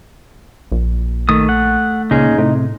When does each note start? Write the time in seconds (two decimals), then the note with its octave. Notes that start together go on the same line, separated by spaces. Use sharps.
0.72 A#1
1.29 D#3 A3 D#6
1.49 F#5
2.11 C#2 A#2 C#4 D#4 G#4
2.38 A2 C3